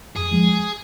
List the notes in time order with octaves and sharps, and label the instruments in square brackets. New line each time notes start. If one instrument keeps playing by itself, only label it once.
[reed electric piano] F2 [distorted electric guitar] G#4
[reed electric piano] F3 G#3